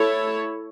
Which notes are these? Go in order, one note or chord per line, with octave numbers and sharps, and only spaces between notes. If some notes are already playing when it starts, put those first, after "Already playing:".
Already playing: A3 E4 A4 C#5